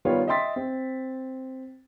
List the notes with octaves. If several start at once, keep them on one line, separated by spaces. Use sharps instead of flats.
D#3 G3 B3 F4 C#5
D#5 E5 G5 C6 A6 B6
C4